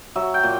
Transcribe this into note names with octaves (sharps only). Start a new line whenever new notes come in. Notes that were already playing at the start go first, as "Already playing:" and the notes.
F#3 E5
G5
A#2